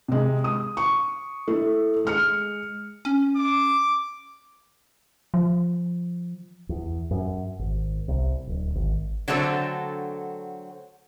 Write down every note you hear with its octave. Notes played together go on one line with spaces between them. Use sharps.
C3 G#3
D#6
C#6
A3 E4
G#3 F6 C#7
C#4
D6
F3
E2
F#2
G#1
C2
D1
G#1
D3 F#3 A3 C4 A4